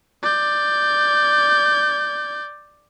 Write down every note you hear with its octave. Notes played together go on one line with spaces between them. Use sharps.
D5 G6